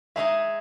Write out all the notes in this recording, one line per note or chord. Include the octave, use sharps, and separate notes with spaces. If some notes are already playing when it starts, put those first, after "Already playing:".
G#3 D#4 G#4 D#5 E5